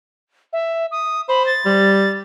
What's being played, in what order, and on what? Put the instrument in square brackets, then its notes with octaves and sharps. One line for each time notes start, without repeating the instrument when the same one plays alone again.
[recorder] E5
D#6
[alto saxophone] C5 [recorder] B5
[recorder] A6
[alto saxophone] G3